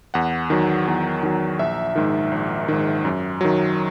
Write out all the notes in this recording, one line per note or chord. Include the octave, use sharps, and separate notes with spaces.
E2 F#5
D#3 F#3
E2
D#3 F#3
A#1 E5
G#2 D#3
A#1
G#2 D#3
F#2
D#3 F#3